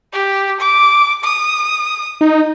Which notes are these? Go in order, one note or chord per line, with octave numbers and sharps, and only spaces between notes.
G4
D6
D#6
D#4